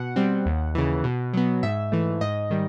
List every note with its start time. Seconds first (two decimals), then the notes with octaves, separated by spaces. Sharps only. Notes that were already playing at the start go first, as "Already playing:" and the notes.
Already playing: B2 F#5
0.16 G3 C4
0.46 D#2
0.75 C#3 E3
1.04 B2
1.34 F#3 B3
1.63 G#2 E5
1.92 E3 A3
2.21 G#2 D#5
2.50 D#3 G3